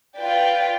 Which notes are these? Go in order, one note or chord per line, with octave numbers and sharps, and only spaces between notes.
F4 B4 D5 G5